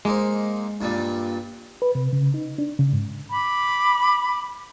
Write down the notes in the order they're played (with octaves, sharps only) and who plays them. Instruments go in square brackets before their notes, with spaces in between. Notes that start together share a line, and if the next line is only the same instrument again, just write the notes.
[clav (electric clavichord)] G#3 [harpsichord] A#3 D#4 C5
[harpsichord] G2 A#2 G3
[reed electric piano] B4
C3
C#3
D#4
D4
C#3
G#2
[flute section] B5 D6